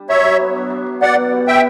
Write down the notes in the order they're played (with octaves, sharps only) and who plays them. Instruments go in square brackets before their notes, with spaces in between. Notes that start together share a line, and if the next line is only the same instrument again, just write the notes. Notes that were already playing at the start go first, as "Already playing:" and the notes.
Already playing: [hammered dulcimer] G3 D4
[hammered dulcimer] F#3 [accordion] C#5 E5
[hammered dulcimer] F#3
B3
D4
F#3
F#3
[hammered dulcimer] B2 [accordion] D5 F#5
[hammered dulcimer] B2
G3
[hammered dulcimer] B3 [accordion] E5 G5